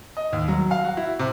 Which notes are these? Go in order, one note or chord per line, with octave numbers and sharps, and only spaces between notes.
D#5
D#2
F#3
F5
F#4
E4
C3